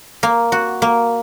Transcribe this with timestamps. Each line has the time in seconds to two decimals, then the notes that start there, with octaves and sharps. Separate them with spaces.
0.23 A#3
0.52 F#4
0.82 A#3